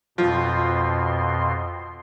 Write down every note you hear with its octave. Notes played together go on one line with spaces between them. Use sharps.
F2 B2 F3 C6